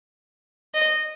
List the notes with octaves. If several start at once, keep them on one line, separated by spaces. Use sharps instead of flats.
D#5